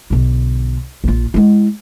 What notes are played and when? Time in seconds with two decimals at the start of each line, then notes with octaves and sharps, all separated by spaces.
0.10 B1 D3
1.04 A#1 F4
1.34 G#3 E4